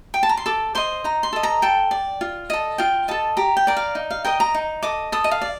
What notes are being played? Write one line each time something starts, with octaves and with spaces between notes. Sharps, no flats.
G5
A5
A#5
C6
A4 D6
C5 D#5 C6
D#4 A#5
C6
A4 D#5
A#5
A4 G5
D5
F4
A4 D#5
F4 G5
A4 D#5 A5
G4 A#5
G5
A#4 D5
F5
D#4
F5
A#4 D#5 G5
A#5
D#4
A4 D#5 D6
A4 D#6
D#5
F5
D5